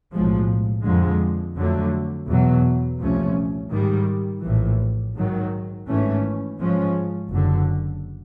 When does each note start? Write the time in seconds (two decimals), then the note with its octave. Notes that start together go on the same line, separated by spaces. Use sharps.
0.13 B1 A2 F3 G#3
0.84 F2 D3 F3 G#3
1.56 F2 D3 F#3 A3
2.28 E2 B2 F#3
3.00 C2 A#2 F3 A3 C#4
3.72 G#2 D#3 G3
4.43 A#1 A2 E3
5.15 G#2 D#3 F#3
5.88 G#1 G#2 E3 A3 C#4
6.59 G#2 F3 G#3 C#4
7.31 F#1 F#2 D3